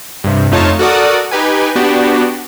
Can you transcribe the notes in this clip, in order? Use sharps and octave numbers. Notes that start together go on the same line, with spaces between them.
G2 C3
F2 A3 D#4 F4 C#5 A5
F#4 A4 A#4 D5 F#5 D#6
D#4 G4 B4 G#5
B3 D4 F#4 G4